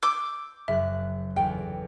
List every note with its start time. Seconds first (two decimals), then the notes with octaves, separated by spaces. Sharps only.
0.03 D6 E6 G6
0.68 F#1 E5 F#6
1.36 G1 E2 G5